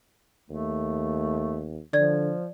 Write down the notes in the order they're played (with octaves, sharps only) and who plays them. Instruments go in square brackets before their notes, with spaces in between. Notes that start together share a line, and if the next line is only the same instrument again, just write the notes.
[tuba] D#2 [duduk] A3
[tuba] D3 [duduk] F3 [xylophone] D5 G#6